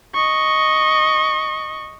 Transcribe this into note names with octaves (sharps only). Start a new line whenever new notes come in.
D#5 C#6